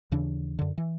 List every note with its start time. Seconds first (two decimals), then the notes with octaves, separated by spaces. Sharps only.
0.11 D#2 C#3 E3 D4
0.59 F#2 D3
0.78 E3